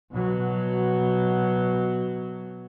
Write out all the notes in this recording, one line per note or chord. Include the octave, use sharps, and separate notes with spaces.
B2 F#3